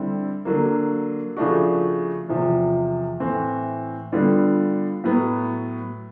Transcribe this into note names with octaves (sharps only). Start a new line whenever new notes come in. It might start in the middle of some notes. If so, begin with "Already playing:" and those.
Already playing: D3 G3 C4 E4
D3 F#3 A#3
C#3 F3 A3 D4 F#4
E2 C3 F3
A2 E3 A3 C4
D3 G3 B3 D4 F4
A2 F#3 B3